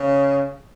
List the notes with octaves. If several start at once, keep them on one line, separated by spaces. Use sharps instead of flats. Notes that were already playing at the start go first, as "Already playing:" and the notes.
Already playing: C#3